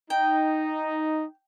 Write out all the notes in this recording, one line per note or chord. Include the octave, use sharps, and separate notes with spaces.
D#4 G5